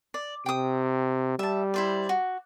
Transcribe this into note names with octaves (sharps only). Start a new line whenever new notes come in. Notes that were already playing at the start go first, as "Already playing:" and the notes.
D5
C3 G5 D#6
G3 E5 A5
E4 C5 D5
F#4